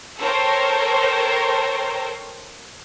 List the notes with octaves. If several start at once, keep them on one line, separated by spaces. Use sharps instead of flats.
A4 A#4 C5 C#5 G5